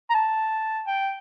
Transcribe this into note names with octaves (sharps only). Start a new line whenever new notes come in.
A#5
A5
G5